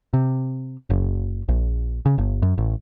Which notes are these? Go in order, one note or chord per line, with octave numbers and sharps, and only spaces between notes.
C3
F#1
A#1
C#3
G1
F#2
A1